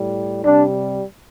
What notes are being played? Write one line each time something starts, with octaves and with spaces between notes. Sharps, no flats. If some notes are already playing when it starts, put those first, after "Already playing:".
Already playing: A2 G3
C3 G3 D4